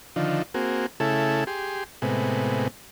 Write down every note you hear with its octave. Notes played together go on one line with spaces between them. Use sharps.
D3 D#3 F3
A#3 C4 F#4 G#4
C#3 A3 E4 G#4 A4
G4 G#4 C6
A2 C3 G#3 B3